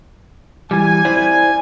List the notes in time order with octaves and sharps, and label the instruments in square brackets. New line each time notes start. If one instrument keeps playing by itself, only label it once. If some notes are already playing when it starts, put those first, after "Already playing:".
[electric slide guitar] E3 G3 [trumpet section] G#5
[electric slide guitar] E4 C5 D5